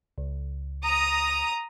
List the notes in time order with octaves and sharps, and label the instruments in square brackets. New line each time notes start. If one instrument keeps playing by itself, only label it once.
[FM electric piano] C#2
[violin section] A#5 D#6